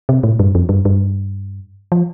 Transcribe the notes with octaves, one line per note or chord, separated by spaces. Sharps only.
C3
A2
G2
F2
G2
G2
F3